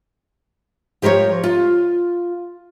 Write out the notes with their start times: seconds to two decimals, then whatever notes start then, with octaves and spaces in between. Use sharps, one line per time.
1.02 F3 G4 A#4 C5 C#5
1.44 F4